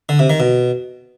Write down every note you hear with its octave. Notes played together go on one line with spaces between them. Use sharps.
D3
C3
D#3
B2